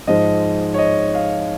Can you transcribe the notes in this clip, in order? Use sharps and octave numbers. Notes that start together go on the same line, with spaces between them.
G#2 F3 G#3 D#5
C#5
D#5
F5